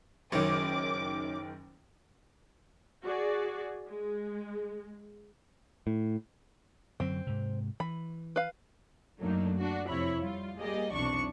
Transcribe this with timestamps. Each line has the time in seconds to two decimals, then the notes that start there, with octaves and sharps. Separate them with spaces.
0.32 F#1 F#2 D#3 C#5 D6
3.03 F#4 G#4 D5
3.88 G#3
5.87 A2
7.00 F#2 D3 F#3 C4
7.27 G#2 C3
7.80 E3 B5
8.36 B4 F5
9.20 F#2 F#3 A3 A#3 D4 D#4
9.57 D4 F#4
9.89 F2 C3 E4 C#5 B5
10.21 G3 F4
10.59 G3 A#3 G4 G#4 D5 D#5
10.94 B1 E2 C3 D4 C#6